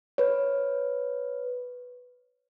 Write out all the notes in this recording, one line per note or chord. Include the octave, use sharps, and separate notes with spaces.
B4 C#5